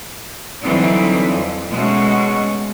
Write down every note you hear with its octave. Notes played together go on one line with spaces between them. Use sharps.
D3 E3 F#3 G3 C4 D#4
F2
B2 G#3 A3 C#4 F#4